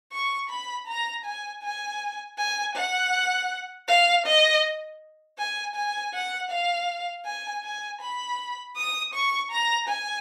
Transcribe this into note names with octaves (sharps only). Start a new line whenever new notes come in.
C#6
B5
A#5
G#5
G#5
G#5
F#5
F5
D#5
G#5
G#5
F#5
F5
G#5
G#5
B5
D#6
C#6
A#5
G#5